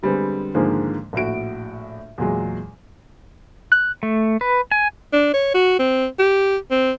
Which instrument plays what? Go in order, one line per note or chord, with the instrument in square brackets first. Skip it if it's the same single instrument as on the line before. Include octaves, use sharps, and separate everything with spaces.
[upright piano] D3 G3 G#3 B3 C4
G#2 D3 D#3 F3 G#3 A#3
A#1 A2 F#4 D7
E2 A#2 F#3 G#3
[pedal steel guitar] F#6
A3
B4
G#5
[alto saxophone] D4
C#5
F#4
C4
G4
C4